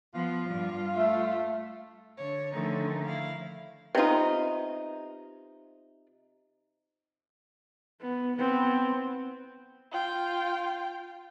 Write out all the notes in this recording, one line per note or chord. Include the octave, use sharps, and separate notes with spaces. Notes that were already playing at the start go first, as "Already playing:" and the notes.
F3 B3 F4
G2 G3
A3 E5
D3 C#5
D3 D#3 F3 A3 C#4 D#4
E4 F5
C3 B3 D#4 F4
B3
B3 C4
F4 G5